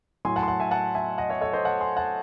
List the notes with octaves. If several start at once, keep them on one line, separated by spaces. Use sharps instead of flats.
A2 F#3 G#5 C6
F#5 A5
C6
F#5 A5
E5 G#5
F#5 A5
E5 G#5
D#5 F#5
C#5 E5
A4 C#5
C5 D#5
F#5 A5
G#5 C6
F#5 A5